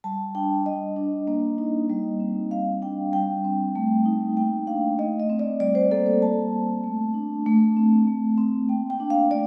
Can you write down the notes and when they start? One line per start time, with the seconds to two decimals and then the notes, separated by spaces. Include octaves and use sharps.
0.04 G3 A5
0.35 D4 G5
0.66 G3 D#5
0.96 D4
1.27 A#3
1.58 D#4
1.90 G3
2.20 C4
2.51 G3 F5
2.82 D4 G5
3.13 G3 G5
3.44 C4
3.75 A3
4.05 D#4
4.37 A#3 G5
4.67 D4 F5
4.99 A3 D#5
5.20 D#5
5.30 C4
5.39 D5
5.60 G3 D5
5.75 C5
5.91 A#3 A4
6.06 C5
6.22 G3 A5
6.53 C4
6.84 A3
7.14 D4
7.46 A3
7.77 C4
8.07 A3
8.38 C4
8.69 A#3 G5
8.90 G5
9.00 D4
9.10 F5
9.30 A3 D5